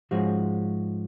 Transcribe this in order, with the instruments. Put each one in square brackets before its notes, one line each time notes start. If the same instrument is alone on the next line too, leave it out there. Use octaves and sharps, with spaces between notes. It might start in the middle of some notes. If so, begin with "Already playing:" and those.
[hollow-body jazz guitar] G#2 F3 G#3 C#4 F#4